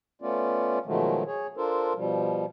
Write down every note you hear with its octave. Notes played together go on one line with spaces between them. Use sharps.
A3 B3 C#4 F4 D5
B2 D#3 F3 F#3 G#3 A3
G#4 C#5
D4 F4 A4 A#4 C5
B2 F3 G3